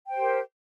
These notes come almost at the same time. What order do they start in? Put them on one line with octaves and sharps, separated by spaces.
G5 C5 G4 A#4